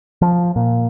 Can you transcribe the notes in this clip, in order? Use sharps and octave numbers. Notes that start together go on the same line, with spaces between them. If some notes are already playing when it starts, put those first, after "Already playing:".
F3
A#2